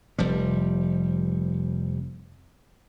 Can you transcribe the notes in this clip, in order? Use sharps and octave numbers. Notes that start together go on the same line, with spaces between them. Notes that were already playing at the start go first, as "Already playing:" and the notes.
F1 F3 G3